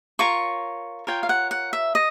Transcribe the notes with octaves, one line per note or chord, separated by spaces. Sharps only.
F4 A#4 C#5 C#6
F4 A#4 C#5 G5
F5
F#5
F#5
E5
D#5